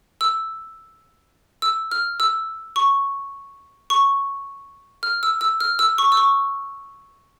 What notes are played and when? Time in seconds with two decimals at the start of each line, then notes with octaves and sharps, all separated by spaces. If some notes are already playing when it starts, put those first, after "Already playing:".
0.21 E6
1.62 E6
1.91 F6
2.20 E6
2.76 C#6
3.90 C#6
5.03 F6
5.23 E6
5.41 E6
5.60 F6
5.79 E6
5.98 C#6
6.12 E6
6.17 C#6